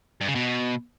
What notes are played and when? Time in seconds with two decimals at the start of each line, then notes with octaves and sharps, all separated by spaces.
0.21 G2
0.28 C#3
0.35 B2